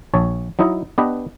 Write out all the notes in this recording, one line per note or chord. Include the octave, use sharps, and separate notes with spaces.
A#1 C#5 A5
F#3 D#4 E4 D#5
B3 D4 G4 B4 D#5